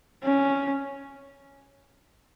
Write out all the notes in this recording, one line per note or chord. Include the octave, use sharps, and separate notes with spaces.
C#4